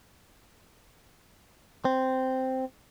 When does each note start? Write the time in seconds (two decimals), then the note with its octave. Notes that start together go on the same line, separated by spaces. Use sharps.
1.85 C4